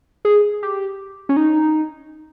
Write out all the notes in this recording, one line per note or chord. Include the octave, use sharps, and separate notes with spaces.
G#4
G4
C#4
D#4